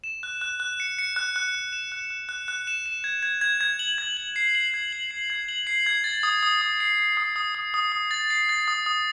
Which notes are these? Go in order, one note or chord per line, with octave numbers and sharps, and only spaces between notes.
E7
F#6
F#6
F#6
C#7
C#7
F#6
F#6
F#6
E7
F#6
F#6
F#6
F#6
E7
E7
G#6
G#6
G#6
G#6
F#7
G#6
F#7
C7
F#7
G#6
F#7
C7
G#6
F#7
C7
G#6
A6
D#6
D#6
D#6
C7
C7
D#6
D#6
D#6
D#6
D#6
A6
C7
A6
D#6
D#6